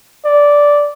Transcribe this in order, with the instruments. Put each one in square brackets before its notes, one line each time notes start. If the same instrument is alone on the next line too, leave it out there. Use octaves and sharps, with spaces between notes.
[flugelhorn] D5